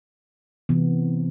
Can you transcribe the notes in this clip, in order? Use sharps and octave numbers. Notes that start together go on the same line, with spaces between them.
C3 E3 B3